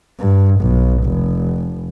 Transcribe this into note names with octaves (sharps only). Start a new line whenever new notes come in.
G2
B1
F1